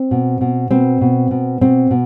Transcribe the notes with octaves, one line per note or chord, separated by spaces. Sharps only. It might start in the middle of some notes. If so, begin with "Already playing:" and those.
Already playing: C4
B2
B2
B2 C4
B2
B2
B2 C4
B2